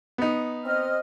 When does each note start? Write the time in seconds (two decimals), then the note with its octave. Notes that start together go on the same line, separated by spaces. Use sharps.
0.18 B3 D#4
0.65 C4 D#5 F6